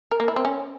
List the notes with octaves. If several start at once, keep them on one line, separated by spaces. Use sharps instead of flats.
A#4
A#3
E4
C4
C#4